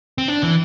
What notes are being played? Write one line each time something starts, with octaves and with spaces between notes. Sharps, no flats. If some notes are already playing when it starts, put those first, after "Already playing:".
C4
D4
E3